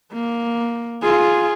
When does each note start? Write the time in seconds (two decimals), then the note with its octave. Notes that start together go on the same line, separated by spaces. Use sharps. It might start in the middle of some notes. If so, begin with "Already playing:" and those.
0.13 A#3
1.03 F4 G#4